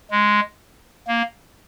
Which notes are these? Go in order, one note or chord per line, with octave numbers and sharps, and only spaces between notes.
G#3
A#3